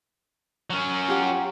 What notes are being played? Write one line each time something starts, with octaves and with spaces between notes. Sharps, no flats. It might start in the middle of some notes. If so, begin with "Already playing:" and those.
F#3 C#4
F4 G4 F#5